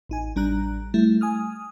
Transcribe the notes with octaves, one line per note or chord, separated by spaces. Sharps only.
A1 D#4 G#5
A1 G3 D4 A#5 F#6
G3 A3 E4
G#5 D#6 F6